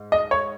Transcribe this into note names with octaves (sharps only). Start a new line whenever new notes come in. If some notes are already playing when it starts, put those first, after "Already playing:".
Already playing: G#2
D#5
C#5